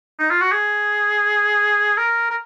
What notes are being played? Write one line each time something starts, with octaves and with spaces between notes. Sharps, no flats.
D#4
F4
F#4
G#4
A#4
A#4